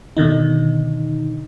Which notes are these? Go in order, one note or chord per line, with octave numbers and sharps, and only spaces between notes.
B2 D3 D#3 D#4